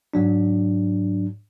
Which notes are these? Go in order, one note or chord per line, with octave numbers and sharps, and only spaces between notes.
G#2 F#3 D4